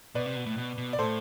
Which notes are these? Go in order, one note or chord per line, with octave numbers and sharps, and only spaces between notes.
B2 B4 D5
C3
B2
A2
B2
B2
D5
A2 A4 C5